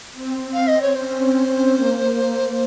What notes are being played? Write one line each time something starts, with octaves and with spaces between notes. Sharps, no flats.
C4
F5
D#5
C#5
C#4 C5
C4
A#3
A#3